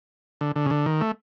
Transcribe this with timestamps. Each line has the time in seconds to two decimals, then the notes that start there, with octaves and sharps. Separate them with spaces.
0.41 D3
0.56 D3
0.65 C#3
0.70 D3
0.86 D#3
1.01 A3